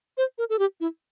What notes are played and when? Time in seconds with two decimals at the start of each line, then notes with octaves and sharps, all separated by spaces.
0.18 C5
0.38 A#4
0.50 A4
0.59 G4
0.80 E4